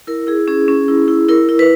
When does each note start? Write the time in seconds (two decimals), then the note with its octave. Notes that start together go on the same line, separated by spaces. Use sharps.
0.07 E4 A#4
0.27 E4 G#4
0.48 C#4 G#4
0.68 C#4
0.88 E4
1.08 E4
1.29 E4 A#4
1.49 E4
1.59 B4